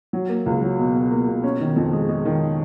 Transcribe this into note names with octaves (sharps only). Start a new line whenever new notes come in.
F#3
A#3
C#2
F#3
B2
B2
A#3
B2
C#4
D#3
F2
G#3
G#3
D#3